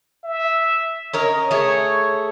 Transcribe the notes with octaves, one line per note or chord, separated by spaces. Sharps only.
E5
C#4 A#4 C#5 D#5
A3 G#4 C#5